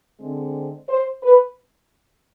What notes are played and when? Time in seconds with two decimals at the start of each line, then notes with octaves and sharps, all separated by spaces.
0.19 D3 G#3 C4
0.88 C5
1.23 B4